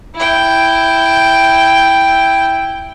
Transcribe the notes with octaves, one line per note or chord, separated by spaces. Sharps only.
E4 G5